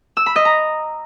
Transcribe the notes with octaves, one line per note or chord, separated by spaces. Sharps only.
E6
B5
D#5
A#5